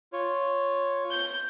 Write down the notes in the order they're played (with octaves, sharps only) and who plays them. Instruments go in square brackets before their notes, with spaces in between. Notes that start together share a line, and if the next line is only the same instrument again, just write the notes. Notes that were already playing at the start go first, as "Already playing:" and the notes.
[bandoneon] F4 C#5
[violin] G6